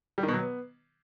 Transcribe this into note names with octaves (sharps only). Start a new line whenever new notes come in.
G3
D#3
B2
F#3
B3